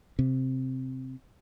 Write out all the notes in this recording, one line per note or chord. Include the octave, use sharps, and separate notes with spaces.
C3